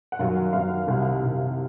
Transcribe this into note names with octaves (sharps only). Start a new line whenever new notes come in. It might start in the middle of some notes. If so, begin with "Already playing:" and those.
F#5
F#2 D#3 F#3 F5
F#5
F#2 D#3 F#3 F5
C2 C3 D#3
C2 C3 D#3